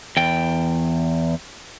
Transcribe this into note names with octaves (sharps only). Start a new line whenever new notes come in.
E2 G5